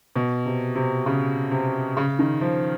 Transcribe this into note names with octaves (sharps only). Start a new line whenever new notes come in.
B2
C3
C3
C#3
C3
C#3
D#3
F3